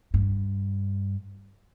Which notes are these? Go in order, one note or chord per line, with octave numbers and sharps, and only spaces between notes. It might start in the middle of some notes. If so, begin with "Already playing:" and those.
G2